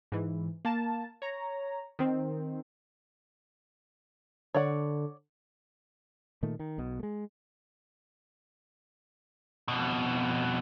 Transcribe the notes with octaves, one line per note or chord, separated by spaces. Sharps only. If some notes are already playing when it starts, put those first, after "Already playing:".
G#2 E3
A#3 A5
C#5 A#5
D#3 C4
D3 C#5 D5 F#5
A#2 D#3 A3
D#3
B1 B2
G#3 A3
F2 B2